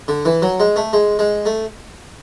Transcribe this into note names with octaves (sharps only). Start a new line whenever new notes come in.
D3
E3
F#3
G#3
A3
G#3
G#3
A3